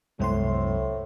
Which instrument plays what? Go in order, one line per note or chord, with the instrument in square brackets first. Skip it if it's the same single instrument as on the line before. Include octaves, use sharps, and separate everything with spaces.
[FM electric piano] C2 C5 C6 [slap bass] F#2 G#3 B3 [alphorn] A2